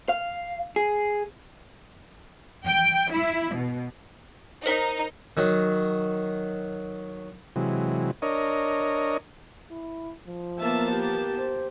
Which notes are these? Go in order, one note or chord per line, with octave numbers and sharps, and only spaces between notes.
F5
G#4
G5
E4
B2
D#4 A#4 C5
D#3 F#3
C3 E3 F#3 G#3
D4 A#4 C#5 D#5
E4
F3
A#3 B3 E5 A5
G4
C5